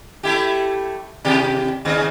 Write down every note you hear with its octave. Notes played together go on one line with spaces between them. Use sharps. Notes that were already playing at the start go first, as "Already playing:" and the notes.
A3 E4 G4
C3 E3 G4
D#2 G#2 C#3